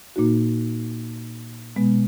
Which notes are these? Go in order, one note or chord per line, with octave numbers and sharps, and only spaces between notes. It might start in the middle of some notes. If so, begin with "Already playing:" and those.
A#2 A#3 D#4 F#4
B2 G#3 B3